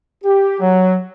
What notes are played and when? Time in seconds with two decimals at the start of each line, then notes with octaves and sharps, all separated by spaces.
0.24 G4
0.60 F#3